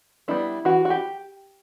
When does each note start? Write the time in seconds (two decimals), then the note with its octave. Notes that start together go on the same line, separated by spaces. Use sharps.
0.28 G3 B3 D4 E4
0.65 E3 F#4
0.85 F#4
0.90 G4